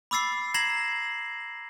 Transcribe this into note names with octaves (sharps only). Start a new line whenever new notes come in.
B5 D6 E6 A6 C7
A#5 G#6 A#6 C7 E7 F#7